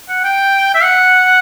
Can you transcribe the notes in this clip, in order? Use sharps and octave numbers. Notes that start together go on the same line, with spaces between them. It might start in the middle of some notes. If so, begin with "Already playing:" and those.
F#5
G5
E5
F#5